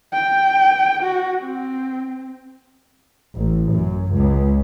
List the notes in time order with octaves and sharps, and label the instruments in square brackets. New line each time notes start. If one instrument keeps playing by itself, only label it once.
[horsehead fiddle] G5
F#4
C4
[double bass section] A1
F#2
C#2